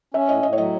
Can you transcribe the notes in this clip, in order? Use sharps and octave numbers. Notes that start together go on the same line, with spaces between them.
C#4 E5
A2 D#5
A2 D#5
C#5
F#3 D#5